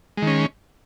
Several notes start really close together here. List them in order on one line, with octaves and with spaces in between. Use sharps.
G#3 D#3 C#4